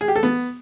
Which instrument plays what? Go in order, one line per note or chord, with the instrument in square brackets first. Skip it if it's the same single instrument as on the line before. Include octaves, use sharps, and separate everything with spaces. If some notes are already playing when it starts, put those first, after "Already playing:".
[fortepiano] G#4
G4
A4
B3